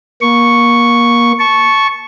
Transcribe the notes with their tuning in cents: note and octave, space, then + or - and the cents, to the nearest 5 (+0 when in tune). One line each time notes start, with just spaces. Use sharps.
A#3 +30 C#6 +0
A5 -15 C#6 +0